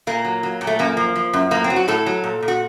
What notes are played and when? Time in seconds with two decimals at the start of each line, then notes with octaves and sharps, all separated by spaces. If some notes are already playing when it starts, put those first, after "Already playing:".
0.07 A#2 A#3
0.25 F#3
0.43 F#3
0.61 A#2
0.67 A3
0.79 F#2 A#3
0.97 F3
1.16 F3
1.33 F#2
1.51 A2 A#3
1.64 C4
1.70 F#3
1.76 F#4
1.88 A2 A4
2.06 F#3
2.24 A#2
2.42 A#2
2.48 F#4